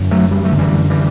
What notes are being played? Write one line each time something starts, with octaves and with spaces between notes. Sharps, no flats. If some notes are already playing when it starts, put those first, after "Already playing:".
Already playing: F#2 D3
F#3 A3
G3
A3
F#2 D3
E3 G3
E3 G3